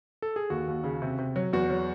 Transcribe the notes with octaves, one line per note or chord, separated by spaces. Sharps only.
A4
G#4
D#2 F#4
D#2
C#3
C3
C3
F#3
E2 F#4
F#3